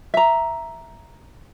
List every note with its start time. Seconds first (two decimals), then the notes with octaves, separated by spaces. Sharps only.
0.14 E5 A#5